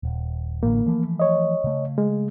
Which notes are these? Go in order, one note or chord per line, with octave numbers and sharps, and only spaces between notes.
D#1
A1 A2 D3 A#3
E3 F3 A3
C#5 D#5
C#3 A3
G#3